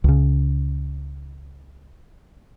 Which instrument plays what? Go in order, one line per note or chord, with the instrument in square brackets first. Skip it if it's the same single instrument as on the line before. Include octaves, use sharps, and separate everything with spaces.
[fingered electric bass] C#2 C#3